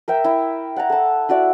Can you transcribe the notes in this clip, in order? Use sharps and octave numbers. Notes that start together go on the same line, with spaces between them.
A#4 E5 G5
E4
F#5 A5 A#5
A4 A5
E4 F#4 D5 E5